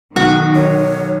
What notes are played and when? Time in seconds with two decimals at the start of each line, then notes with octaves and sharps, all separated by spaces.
0.16 B1 D#3 F#4
0.55 C#5